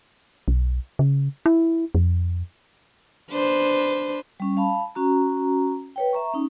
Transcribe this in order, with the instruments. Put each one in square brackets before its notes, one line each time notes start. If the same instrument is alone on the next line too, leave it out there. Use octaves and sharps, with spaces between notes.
[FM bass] B1
C#3
E4
F2
[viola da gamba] D4 B4 C5
[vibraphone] G3 C#4
F5 A5 B5
C#4 F#4 A#5
B4 C#5 G5
E5 A#5 C#6
C#4 D#4